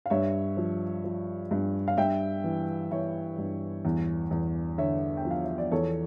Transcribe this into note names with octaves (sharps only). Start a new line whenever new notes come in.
F5
G2 C#5 E5
F3
F3
G2
F5
G2 E5 G5
E3
E3 C#5 E5
G2
E2
E2
D3 C#5 E5
G5
F3
F5
E5
D5
E2 A4 C#5